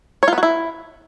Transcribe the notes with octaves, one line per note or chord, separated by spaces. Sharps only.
C#5
F4
B3
F#4
E4